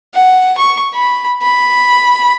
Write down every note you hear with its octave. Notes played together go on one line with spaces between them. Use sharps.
F#5
C#6
B5
B5